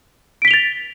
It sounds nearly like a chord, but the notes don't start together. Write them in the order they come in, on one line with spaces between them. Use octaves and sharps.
D7 B6 G7 F7 A6